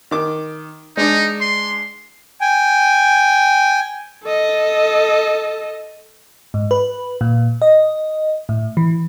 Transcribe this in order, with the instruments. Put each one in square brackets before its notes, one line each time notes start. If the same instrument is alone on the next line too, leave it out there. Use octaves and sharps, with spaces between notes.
[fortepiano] D#3 D6
[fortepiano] G#3 D4 D5 [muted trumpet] D#4
[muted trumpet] C6
[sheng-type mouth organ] G5 G#5
[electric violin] A4 D#5
[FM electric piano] G#2
B4
A#2
D#5
A2
E3